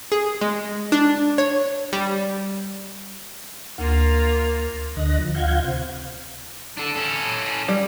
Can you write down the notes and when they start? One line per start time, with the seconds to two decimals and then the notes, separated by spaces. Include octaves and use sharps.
0.12 G#4
0.41 G#3
0.92 D4
1.38 C#5
1.93 G3
3.78 D2 A#3 F4
4.97 D2 D3 D#5 F#6 A#6
5.19 F3
5.35 D2 F4 F5 F#5 G6 G#6
5.64 C3 C5
6.77 D4 A4
6.96 C#4 A4
7.68 G3